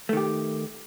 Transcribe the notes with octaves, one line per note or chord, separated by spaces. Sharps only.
D#3 A3 G4